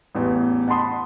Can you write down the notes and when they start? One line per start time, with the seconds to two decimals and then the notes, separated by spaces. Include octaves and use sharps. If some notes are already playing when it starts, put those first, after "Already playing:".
0.15 A1 E2
0.68 F#5 A5 B5 C6 D#6